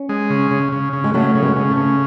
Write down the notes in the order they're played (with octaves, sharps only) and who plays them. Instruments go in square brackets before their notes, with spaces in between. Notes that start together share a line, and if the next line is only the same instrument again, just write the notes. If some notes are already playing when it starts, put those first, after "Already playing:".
Already playing: [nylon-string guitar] C#4
[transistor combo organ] G#3
C#3
C#3
C#3
C#3
[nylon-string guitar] G#3
[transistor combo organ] C#3 [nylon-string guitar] F#3 A3
[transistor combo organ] C#3
[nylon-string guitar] G#3 B3
[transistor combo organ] C#3
[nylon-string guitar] A3 C#4
[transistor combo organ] C#3